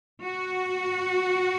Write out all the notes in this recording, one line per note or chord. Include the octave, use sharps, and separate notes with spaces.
F#4